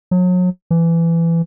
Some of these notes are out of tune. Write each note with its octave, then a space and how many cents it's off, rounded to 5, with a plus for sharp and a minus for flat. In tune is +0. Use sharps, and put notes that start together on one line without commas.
F#3 -35
E3 +20